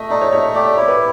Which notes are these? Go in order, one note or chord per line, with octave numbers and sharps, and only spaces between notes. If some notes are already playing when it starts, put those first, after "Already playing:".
Already playing: A3 D#5
D#4 D5
C#5
A3 C#5
G4 D5
D5
E4 C#5
B4